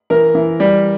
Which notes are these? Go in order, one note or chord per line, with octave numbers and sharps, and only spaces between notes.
E3 A#4
E3
G3